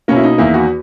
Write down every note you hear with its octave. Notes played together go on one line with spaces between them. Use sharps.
B2 A#3 C#4
E4
D#4
E2 D#3 A#3 E4
F#4